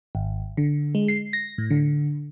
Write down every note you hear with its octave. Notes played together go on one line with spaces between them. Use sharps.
G#1
D3
G#3
C7
A#6
A2
D3